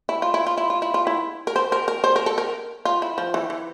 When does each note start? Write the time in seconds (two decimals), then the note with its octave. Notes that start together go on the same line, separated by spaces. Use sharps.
0.09 E4
0.22 F4
0.34 E4
0.47 F4
0.58 E4
0.70 F4
0.82 E4
0.94 F4
1.07 E4
1.47 A#4
1.56 C5
1.72 A#4
1.88 A#4
2.04 C5
2.16 A#4
2.26 A4
2.38 A#4
2.85 F4
3.02 E4
3.18 F3
3.34 E3
3.50 E3